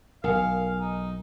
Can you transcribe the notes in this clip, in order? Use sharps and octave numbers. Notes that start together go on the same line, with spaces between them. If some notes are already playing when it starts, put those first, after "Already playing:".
B1 A#4 F5 G#5
D#4